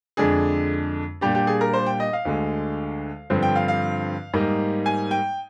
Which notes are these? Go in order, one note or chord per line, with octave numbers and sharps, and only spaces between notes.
F2 D3 G#3 D4 G#4
A#2 G3 D4 G4
G4
G#4
A#4
C5
G5
D#5
F5
D2 D3 G#3
G2 D3 F3 C4
G5
F5
F5
G#2 G3 A#3 D#4
G#5
G5